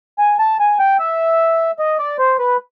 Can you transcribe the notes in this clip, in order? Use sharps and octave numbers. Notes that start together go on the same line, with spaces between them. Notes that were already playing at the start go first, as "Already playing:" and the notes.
G#5
A5
G#5
G5
E5
D#5
D5
C5
B4